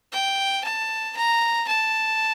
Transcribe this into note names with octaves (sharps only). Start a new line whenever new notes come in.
G5
A5
A#5
A5